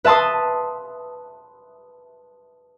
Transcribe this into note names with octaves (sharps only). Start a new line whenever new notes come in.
B4 E5 A5 C6 D#6